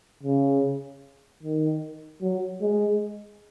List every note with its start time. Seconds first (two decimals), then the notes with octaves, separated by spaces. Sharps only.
0.23 C#3
1.43 D#3
2.22 F#3
2.62 G#3